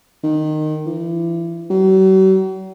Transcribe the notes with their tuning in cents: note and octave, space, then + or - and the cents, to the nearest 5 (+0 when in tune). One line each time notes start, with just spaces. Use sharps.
D#3 -15
E3 +35
F#3 +45